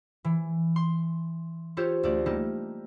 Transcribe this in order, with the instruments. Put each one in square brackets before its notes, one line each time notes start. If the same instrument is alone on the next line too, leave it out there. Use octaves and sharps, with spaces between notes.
[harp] E3
C6
F4 G4 A4 C5 C#5
D2 A3 D5
G3 A#3 D#4 A4